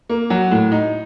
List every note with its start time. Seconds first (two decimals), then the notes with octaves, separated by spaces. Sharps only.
0.09 A#3
0.30 F#3
0.51 A2
0.72 D#4